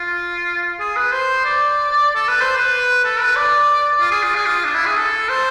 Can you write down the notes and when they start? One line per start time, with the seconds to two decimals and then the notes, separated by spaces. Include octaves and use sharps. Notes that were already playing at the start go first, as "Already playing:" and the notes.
Already playing: F4
0.80 G#4
0.96 B4
1.12 C5
1.45 D5
2.15 A4
2.28 B4
2.41 C5
2.56 B4
3.04 A4
3.21 B4
3.36 D5
4.01 F4
4.11 G#4
4.23 F4
4.35 G#4
4.46 F4
4.65 D4
4.75 E4
4.86 G#4
4.97 A4
5.29 C5